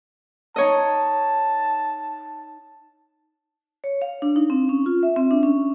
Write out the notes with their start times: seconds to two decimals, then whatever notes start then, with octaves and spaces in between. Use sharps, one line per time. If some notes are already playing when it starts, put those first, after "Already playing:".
0.56 D#4 C#5 D#5 A5
3.84 C#5
4.02 F5
4.22 D4
4.36 D#4
4.50 C4
4.69 C#4
4.86 F4
5.03 E5
5.16 C4
5.31 D4
5.43 C#4